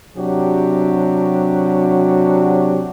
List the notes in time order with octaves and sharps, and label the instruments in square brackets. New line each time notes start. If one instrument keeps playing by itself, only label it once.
[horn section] C3 F#3 D4 F#4 G4